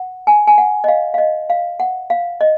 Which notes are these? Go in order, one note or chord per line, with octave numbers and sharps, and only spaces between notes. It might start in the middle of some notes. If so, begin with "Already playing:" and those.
Already playing: F#5
G#5
G#5
F#5
D#5
F5
F5
D#5
F5
F#5
F5
D#5